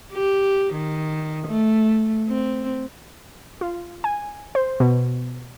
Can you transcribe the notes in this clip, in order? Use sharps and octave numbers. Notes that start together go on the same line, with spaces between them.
G4
D#3
A3
C4
F4
G#5
C5
B2